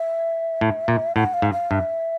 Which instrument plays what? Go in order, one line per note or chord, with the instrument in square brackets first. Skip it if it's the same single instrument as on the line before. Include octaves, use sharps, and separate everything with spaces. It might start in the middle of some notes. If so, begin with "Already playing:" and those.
Already playing: [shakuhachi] E5
[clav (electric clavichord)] A2
A#2
[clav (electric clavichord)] A2 [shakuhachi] F#5
[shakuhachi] F5
[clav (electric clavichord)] G#2
[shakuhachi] F5
[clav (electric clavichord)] G2 [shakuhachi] E5